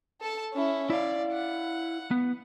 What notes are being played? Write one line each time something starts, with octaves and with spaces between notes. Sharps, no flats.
A4 A5
C#4 E4
E4 D5 F5
F#5
B3